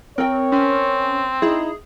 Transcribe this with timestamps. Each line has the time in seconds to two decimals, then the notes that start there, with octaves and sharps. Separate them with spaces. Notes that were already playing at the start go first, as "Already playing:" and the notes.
0.18 C4 A#4 C#5 G5
0.52 C4 C#4
1.42 D#4 E4 G#4